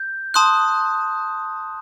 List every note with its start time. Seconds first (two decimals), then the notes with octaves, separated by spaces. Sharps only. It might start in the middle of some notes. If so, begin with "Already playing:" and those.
Already playing: G6
0.34 A5 C6 D#6 F#6